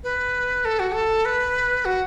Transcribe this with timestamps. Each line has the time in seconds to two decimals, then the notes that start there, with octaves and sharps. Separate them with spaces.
0.04 B4
0.65 A4
0.79 F#4
0.94 A4
1.25 B4
1.85 F#4